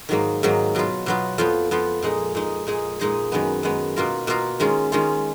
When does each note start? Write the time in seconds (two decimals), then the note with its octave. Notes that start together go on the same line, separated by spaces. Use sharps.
0.09 G#2 D#3 F#3 A#3
0.43 G#2 D#3 F#3 A#3
0.75 B2 F#3 B3 F4
1.06 B2 F#3 B3 F4
1.38 F2 F3 B3 F4
1.71 F2 F3 B3 F4
2.03 A#2 G#3 D#4
2.35 A#2 G#3 D#4
2.67 A#2 G#3 D#4 G#4
3.00 A#2 G#3 D#4 G#4
3.32 F#2 D#3 G#3 B3
3.63 F#2 D#3 G#3 B3
3.96 B2 A#3 F4 A#4
4.27 B2 A#3 F4 A#4
4.60 D#3 G#3 C#4 F4
4.92 D#3 G#3 C#4 F4